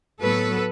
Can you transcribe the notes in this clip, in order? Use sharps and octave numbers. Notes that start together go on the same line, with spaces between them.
A2 F#3 B3 A4 B4